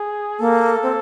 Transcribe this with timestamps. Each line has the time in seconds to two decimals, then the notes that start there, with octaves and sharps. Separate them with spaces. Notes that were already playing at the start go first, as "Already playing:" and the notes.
Already playing: G#4
0.40 A#3 A4
0.83 C4